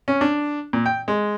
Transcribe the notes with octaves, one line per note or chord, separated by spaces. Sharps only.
C#4
D4
A#2
G5
G#3